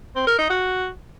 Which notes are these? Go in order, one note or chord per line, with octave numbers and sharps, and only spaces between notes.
C4
A#4
D#4
F#4